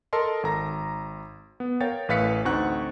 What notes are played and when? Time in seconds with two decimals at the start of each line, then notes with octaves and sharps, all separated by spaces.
0.13 A4 A#4 D#5 A5 C6
0.43 G#1 A#5 A#6
1.60 B3
1.81 A#4 C#5 F5 G5 A6
2.09 A1 A2 B4 F5 B6 C#7
2.45 D2 C4 D#4 F#5 C#6 F#6